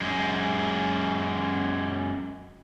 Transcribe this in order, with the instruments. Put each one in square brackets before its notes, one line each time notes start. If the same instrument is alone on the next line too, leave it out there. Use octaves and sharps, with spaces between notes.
[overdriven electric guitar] F#2 G#3